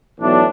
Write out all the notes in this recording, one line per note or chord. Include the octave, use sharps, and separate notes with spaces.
B1 A2 E3 A3 D4